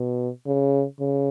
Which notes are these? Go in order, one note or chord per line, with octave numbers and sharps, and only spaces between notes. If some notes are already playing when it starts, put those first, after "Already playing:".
Already playing: B2
C#3
C#3